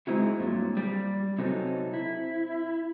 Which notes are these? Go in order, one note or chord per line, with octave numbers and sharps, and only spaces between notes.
G#3 C4 D#4 E4 F#4
G2 A#2 F#3
G3 D5
C3 F#3 C4 D#4 A4
E4